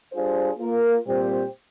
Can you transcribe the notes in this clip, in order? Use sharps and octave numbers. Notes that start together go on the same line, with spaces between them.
G3 D4 F4 G#4 C5
A#3 F4 A#4
A#2 G3 C4 G4 C5